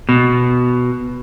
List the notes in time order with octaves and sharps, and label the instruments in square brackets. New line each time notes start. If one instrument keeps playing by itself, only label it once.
[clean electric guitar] B2